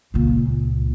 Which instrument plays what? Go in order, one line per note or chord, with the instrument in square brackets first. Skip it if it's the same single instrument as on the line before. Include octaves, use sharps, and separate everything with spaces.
[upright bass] C#2 A#2